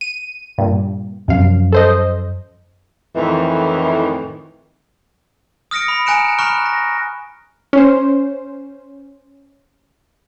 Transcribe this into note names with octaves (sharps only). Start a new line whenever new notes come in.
D#7
G2 A#2
F#2 C3 F3 F5
A4 C5 D#5
F2 A2 D#3 E3
D#6 F6 A#6 C#7 D7
B5
G#5 A#5 F#6 C#7 D7 E7
A#5 B5 C#6 F6 F#6
A#6
C#4 C5